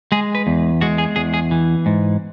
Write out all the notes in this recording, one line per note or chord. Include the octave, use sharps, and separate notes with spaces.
G#3 G#4
B4
E2
G#3 F#4
G#4
E2 G#4
G#4
E3
G#2